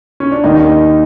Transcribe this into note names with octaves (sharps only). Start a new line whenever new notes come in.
C#4
D4
D#2 D#3 D#4